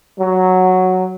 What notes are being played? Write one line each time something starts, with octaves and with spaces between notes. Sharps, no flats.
F#3